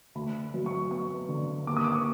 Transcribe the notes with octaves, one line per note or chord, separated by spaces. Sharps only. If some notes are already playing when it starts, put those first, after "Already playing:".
D2 B5
F#3
C#6
B3 C#6
D3
D#2 D6
D#6
D6
C#6